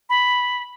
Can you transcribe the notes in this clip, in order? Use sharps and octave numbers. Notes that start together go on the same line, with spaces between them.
B5